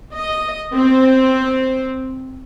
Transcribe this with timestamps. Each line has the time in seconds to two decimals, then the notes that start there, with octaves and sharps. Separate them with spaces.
0.15 D#5
0.75 C4